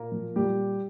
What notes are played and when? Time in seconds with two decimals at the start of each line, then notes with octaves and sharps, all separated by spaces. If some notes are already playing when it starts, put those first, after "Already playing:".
Already playing: A#2 A#3 A#4
0.12 F3
0.35 A#2 G3 G4